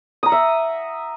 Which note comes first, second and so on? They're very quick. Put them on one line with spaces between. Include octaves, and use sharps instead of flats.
D#6 A#5 F#5 E5